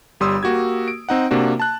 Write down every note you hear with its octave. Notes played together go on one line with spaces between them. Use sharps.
G1 G3 C6 D#6 E6
A#3 F#4 G4 G#6
D7
C4 D#4 F#5
C3 A#3 D4 F#4
A5 F#6